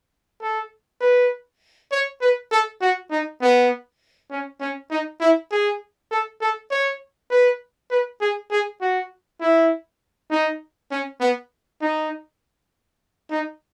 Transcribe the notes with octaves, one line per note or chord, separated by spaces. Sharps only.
A4
B4
C#5
B4
A4
F#4
D#4
B3
C#4
C#4
D#4
E4
G#4
A4
A4
C#5
B4
B4
G#4
G#4
F#4
E4
D#4
C#4
B3
D#4
D#4